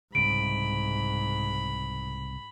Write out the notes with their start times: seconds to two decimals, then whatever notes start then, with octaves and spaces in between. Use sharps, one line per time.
0.15 C2 G#2 C#3 B5 D7